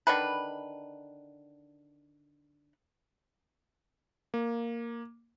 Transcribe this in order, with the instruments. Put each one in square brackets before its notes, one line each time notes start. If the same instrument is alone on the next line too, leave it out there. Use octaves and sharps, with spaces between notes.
[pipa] D3 D#3 B4
[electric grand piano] A#3